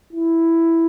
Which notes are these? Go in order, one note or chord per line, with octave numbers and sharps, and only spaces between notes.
E4